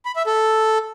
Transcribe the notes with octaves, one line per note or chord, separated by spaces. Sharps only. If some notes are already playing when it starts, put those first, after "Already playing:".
B5
E5
A4